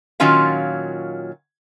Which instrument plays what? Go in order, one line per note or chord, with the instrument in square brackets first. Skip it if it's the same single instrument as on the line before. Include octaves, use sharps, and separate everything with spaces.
[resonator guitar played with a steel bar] A#2 D#3 F#3 C#4 F4 F5